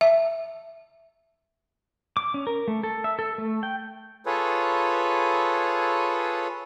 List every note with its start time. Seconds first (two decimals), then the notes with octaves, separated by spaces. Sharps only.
0.01 E5
2.17 D6
2.34 C#4
2.47 A#4
2.68 A3
2.83 A4
3.04 E5
3.19 A4
3.38 A3
3.63 G5
4.26 F4 G#4 A4 B4 C#5